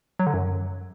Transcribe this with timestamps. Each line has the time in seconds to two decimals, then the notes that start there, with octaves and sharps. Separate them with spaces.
0.19 F#3
0.27 D3
0.34 F#2